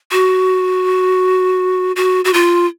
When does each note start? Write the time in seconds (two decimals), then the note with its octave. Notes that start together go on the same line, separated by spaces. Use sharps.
0.12 F#4
1.96 F#4
2.25 F#4
2.33 F4